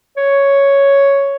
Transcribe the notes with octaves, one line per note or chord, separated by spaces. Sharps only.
C#5